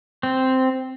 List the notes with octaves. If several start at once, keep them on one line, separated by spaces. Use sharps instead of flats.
C4